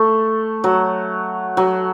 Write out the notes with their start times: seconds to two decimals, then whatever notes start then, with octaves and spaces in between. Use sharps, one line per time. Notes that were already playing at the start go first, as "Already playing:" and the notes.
Already playing: A3
0.64 F#3
1.57 F#3